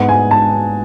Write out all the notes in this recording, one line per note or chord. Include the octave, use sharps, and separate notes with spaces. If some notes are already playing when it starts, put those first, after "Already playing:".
Already playing: G#2 G#3 B3 F#5
G#5
A5